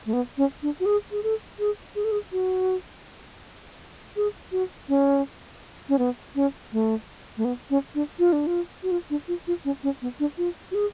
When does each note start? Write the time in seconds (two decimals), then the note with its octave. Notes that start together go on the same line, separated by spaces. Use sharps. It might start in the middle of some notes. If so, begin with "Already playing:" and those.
0.06 A3
0.13 B3
0.38 C#4
0.62 D4
0.80 F#4
0.86 G#4
1.11 G#4
1.23 A4
1.59 G#4
1.95 G#4
2.04 A4
2.12 G#4
2.32 F#4
4.16 G#4
4.52 F#4
4.89 C#4
5.89 C#4
5.98 B3
6.35 C#4
6.73 A3
7.37 A3
7.45 B3
7.70 C#4
7.95 D4
8.19 F4
8.33 D4
8.47 F4
8.83 F#4
8.91 F4
9.10 D4
9.28 F4
9.47 F4
9.65 C#4
9.83 C#4
10.02 B3
10.20 D4
10.38 F4
10.71 F#4
10.75 G#4